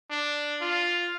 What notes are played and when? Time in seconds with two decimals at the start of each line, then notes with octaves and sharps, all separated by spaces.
0.11 D4
0.61 F4